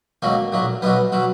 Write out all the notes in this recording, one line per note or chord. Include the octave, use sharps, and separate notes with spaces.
C#2 B2 F#3 A#3
B1 A#2 F#3
B1 B2 F#3 B3
B2 F#3